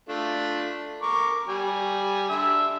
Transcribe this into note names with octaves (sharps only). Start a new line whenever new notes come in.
A3 D4 F4
A#4 C#6 D6
G3 G#5
D3 E5 E6